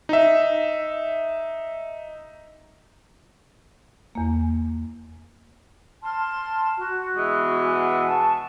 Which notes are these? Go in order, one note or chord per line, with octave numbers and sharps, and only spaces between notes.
D#4 E5
E2 A#3
A5 C6 F6
F#4
B2 E3 G#3
F#5 G#5
A5 C#6